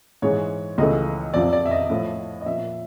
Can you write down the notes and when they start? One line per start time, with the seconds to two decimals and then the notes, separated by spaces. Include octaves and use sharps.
0.22 G#2 E3 G#3 C#5
0.78 C#2 C#3 E3 A3 D#5
1.34 F2 C3 F3 D5
1.53 D5
1.66 E5
1.71 D#5
1.90 A2 F3 A3
2.42 D#5
2.46 A#2 F3 A#3 E5